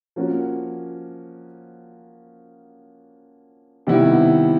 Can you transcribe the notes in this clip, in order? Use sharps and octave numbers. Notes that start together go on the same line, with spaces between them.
F3 A#3 C#4 F#4
C3 D#3 G3 B3 E4